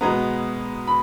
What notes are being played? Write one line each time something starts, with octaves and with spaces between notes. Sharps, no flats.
B2 G#3 B3 A#5
B5